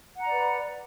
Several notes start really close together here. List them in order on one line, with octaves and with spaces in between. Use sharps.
F#5 A#5 D5 B4